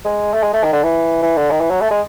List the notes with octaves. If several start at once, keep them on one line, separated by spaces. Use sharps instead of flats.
G#3
A3
G#3
A3
D#3
D3
E3
E3
D3
D#3
E3
F#3
A3
G#3